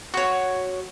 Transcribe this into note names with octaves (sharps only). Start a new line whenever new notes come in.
F#4 C#5